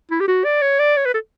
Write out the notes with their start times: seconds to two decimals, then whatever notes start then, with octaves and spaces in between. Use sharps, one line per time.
0.11 E4
0.20 G4
0.28 F#4
0.45 D5
0.62 C#5
0.79 D5
0.97 C#5
1.05 B4
1.14 A4